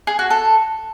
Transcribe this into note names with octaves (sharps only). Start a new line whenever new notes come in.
G#4
F#4
A4